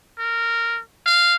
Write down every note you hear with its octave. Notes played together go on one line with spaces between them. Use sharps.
A#4
F5